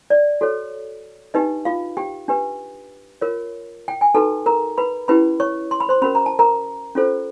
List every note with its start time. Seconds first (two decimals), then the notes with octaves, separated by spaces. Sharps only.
0.10 D5
0.41 F#4 A4 C#5
1.34 D4 D#4 G4 B4 D#5
1.65 F4 F5
1.97 G4 G5
2.28 D4 G4 B4
3.21 F4 A#4 C#5
3.88 G5
4.01 G#5
4.15 D#4 F#4 A4 B4 A5
4.46 A#4 A#5
4.78 B4 B5
5.08 C#4 E4 G4 B4 B5
5.40 C#5 C#6
5.71 C6
5.80 B5
5.89 C5 C6
6.02 C#4 F#4 A#4 B5
6.15 A#5
6.26 A5
6.39 A#4 A#5
6.95 C#4 F4 A4 C5